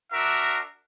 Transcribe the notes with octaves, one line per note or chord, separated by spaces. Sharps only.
D4 F#4 A#4 E5